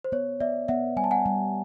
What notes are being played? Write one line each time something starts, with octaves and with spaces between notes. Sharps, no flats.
C5
B3 C#5
B3 D5 E5
B3 E5 F#5
G3 G#5
A5
F#5 G#5
G3